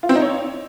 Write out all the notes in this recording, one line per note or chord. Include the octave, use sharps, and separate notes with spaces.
F4
C4
D#4
C#5